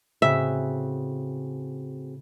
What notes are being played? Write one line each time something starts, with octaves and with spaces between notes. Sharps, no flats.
A2 C#3 C4 F#4 G#4 E5 F#6